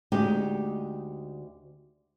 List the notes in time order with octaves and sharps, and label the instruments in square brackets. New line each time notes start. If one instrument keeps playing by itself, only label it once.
[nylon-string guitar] D2 G#3 D#4 G4